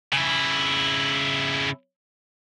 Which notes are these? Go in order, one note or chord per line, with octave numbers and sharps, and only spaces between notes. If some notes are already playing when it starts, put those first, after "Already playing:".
C#3 E4